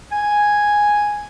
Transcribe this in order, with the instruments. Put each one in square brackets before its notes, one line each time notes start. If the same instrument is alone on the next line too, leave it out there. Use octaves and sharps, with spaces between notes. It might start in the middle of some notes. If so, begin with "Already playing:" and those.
[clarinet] G#5